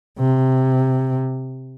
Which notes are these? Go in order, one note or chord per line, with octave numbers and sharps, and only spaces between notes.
C3